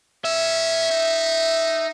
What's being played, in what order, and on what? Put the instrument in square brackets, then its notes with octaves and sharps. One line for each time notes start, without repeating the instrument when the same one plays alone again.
[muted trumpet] C#4 [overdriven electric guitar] E5
[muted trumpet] D#4